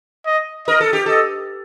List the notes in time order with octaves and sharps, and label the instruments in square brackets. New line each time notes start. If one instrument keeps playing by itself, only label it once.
[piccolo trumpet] D#5
[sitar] A#4 [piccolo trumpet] D#5
[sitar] A4
G4
[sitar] A4 [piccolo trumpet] D#5